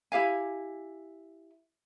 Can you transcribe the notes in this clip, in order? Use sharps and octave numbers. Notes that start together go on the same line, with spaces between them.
E4 G4 F5 G#5